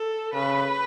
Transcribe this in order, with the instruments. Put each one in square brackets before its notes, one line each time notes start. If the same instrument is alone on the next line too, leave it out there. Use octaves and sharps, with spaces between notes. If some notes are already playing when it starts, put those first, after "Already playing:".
Already playing: [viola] A4
[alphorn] C#3 [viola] B4